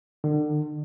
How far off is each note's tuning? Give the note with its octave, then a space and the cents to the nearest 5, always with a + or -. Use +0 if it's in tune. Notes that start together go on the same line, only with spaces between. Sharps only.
D3 +40